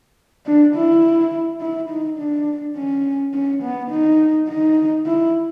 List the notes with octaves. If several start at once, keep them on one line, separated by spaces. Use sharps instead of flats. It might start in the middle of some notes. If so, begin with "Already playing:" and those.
D4
E4
E4
D#4
D4
C#4
C#4
B3
D#4
D#4
E4